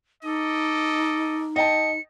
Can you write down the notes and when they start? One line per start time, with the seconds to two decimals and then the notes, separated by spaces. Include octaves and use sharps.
0.24 D#4 A4 D#5 D6
1.56 D#5 G5 A5 C#7